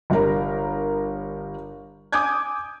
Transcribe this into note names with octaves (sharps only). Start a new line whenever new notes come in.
G1 G3 A#4 A#5
G#5 D6 D#6 G6 G#6